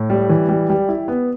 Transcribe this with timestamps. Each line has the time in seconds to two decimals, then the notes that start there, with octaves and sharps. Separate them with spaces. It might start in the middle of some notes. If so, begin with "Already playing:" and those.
Already playing: A2
0.10 G3
0.29 E3
0.49 G3
0.70 G3
0.89 E4
1.08 B3